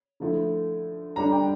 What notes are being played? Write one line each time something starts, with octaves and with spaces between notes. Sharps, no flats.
D3 F3 A3 E4
D3 G3 D4 A#5
G5